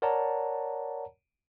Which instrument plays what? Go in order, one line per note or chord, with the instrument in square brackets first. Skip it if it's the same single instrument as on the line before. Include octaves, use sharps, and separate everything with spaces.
[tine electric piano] A#4 C#5 D5 F#5 A5 A#5